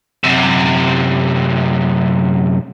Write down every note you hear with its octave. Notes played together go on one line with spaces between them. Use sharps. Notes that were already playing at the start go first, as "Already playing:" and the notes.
F#2 C3